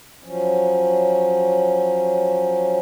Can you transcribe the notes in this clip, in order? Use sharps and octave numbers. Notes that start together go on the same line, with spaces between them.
F3 F#3 C#4